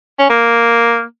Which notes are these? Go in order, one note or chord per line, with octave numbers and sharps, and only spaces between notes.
C#4
A#3